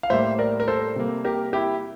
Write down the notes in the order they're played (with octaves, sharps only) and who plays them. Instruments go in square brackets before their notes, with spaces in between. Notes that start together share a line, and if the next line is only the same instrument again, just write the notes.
[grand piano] F5
A2 G3 A#3 C5 E5
A#4 D5
A#4
A4 C5
C3 G3 A#3
G4 A#4
E4 G4